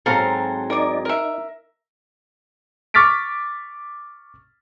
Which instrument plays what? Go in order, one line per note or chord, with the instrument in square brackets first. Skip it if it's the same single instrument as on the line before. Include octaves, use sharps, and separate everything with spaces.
[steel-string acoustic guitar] G#2 F#3 C4 [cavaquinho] A4 F5 A#5
[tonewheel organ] D#4 D5 [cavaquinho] A#4 D#6
[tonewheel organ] D#4 [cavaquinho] A#4 E5
[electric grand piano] C#6 D6 F6 A6 B6 D7